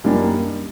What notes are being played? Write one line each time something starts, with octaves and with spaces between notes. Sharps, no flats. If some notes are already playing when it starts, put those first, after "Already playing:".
F#2 D#3 G3 A#3 D4